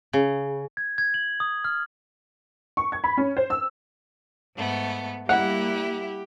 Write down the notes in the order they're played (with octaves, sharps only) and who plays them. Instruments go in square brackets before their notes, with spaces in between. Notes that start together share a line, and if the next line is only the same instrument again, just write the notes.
[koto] C#3
[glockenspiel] G#6
G#6
F#7
D#6
F6
[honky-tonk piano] C#6
G#6
B5
C#4
C5
E6
[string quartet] G#2 A3 B3
[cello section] G3 A#3 [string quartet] E4 [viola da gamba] G4 [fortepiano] F#5